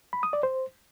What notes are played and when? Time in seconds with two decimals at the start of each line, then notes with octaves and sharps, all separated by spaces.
0.13 B5
0.23 D#6
0.33 D5
0.43 C5